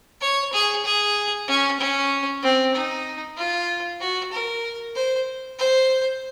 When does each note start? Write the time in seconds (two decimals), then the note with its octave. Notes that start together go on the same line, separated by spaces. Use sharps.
0.21 C#5
0.53 G#4
0.85 G#4
1.48 C#4
1.80 C#4
2.43 C4
2.74 D#4
3.37 F4
4.00 F#4
4.32 A#4
4.95 C5
5.59 C5